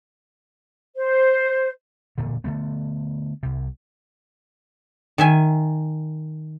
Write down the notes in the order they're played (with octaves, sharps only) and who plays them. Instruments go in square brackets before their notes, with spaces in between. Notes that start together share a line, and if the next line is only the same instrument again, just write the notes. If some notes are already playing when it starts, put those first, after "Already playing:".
[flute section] C5
[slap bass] E1 A#2 D3
D3 F#3 A3 B3
C2 C3
[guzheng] D#3 E5 G#5